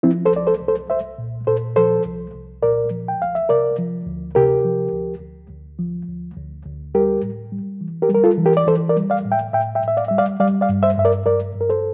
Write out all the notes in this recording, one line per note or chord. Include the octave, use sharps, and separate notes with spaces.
F3 C4 E4
A4 C5
C2 D5
A4 C5
C2
A4 C5
C2 C5 E5
A#2
A#2 A4 C5
F3 A4 C5
C2
C2
A#2 A#4 D5
F3
G5
C2 F5
E5
C3 A#4 D5
F3
D2
C3 G4 A#4
F3
D2
D2
D2
F3
D2
D2
D2
G3 G4 A#4
A2
G3
E3
G4 A#4
G3
A#4
F4 A4
E3
G4 A#4
D5
E3 A4 C5
A#4 D5
G3
D5 F5
A2
E5 G5
A2 E5 G5
E5 G5
A2
E5
D5 F5
G3 E5
D5 F5
G3 D5 F5
D5 F5
G2
C5 E5
G2 E5
A#4 D5
G2 A#4 D5
G2
A#4
A4 C5